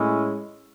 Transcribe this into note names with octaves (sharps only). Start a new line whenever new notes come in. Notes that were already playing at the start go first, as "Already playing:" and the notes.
Already playing: A2 G#3 C#4 E4